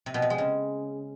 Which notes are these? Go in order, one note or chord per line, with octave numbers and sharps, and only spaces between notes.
C3
B2
C3
G#3
C#3